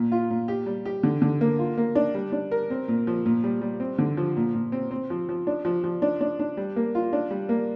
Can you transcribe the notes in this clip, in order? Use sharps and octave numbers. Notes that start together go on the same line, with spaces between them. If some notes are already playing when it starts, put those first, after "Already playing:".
Already playing: A#2
F4
A#2
G4
G3
G4
D3
D3
A#3
F4
A#3
D4
G3
D4
A#4
C4
A#2
F3
A#2
G3
G3
C4
D3
F3
A#2
A#2
C4
C4
F3
F3
D4
F3
F3
D4
D4
D4
G3
A#3
F4
D4
G3
A#3